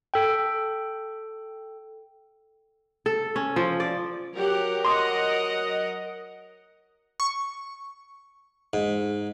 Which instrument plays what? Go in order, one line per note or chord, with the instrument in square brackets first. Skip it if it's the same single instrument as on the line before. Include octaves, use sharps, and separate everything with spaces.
[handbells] A4 G5
[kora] A4
C#4
F3
D5
[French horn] F#3 [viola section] G4 F#5 [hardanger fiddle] A#4
[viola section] D#5 F#5 [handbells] C6 D6 D#6
[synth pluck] C#6
[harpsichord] G#2